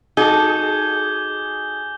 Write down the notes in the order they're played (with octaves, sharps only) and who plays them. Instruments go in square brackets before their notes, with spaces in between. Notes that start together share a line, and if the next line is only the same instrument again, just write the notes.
[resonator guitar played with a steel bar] D#4 F#4 A4 [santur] G#4 [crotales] D6 G6 G7